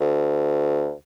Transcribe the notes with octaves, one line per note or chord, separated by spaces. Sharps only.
D2